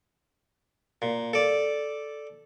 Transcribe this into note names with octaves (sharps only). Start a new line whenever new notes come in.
A#2
A4 D5